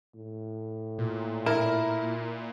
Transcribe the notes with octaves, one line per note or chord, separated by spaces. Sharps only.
A2
A#2
E4 A#4 A5